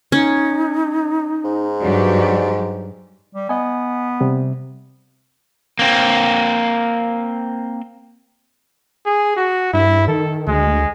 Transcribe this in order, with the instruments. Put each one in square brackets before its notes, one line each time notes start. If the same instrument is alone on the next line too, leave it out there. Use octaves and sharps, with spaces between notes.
[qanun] C#4 [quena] D#4
[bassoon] G#2
[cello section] G2 F#3 G4 [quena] D5
[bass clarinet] G3
[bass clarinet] B3 [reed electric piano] D#5 G#5
[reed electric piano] C3 G3
[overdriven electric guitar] A#3 C4
[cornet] G#4
F#4
[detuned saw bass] G2 [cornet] E4
[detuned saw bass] D#3 [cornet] A4
[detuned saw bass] D2 [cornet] G#3